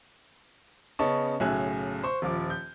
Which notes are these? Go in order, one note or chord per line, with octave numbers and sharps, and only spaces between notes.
C#3 B3 C#4 D#5 A5 C#6
B1 A2 C#3 E5 G#5 F#6
C5 C#6
D#1 F3 D6
G6